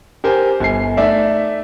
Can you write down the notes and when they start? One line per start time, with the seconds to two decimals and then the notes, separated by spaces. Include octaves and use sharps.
0.24 G4 A#4 C5 G#5
0.60 G1 G#5 C7
0.97 A3 D#4 D5 E5